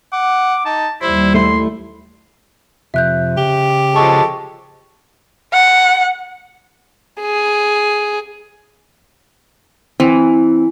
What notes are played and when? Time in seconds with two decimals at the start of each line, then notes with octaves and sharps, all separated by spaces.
0.13 F#5 D6
0.65 D#4 A5
1.02 D#2 G3 E4 C5
1.34 A3 E4 C6
2.94 F2 C3 E5 F#6 G6
3.37 C#3 G4 G7
3.95 F3 G#3 A4 G5 C#6 D7
5.53 F#5
7.21 G#4
10.00 E3 C4